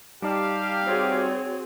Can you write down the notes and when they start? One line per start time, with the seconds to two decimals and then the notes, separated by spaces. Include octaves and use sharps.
0.22 G3 D#4 G4 D5 F5 A5
0.86 C4 F#4 G#4 C#5